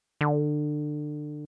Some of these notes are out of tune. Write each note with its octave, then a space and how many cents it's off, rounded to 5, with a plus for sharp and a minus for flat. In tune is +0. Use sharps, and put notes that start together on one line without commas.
D3 +25